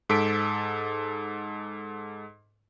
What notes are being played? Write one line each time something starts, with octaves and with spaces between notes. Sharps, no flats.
G#2 A4 B6 D7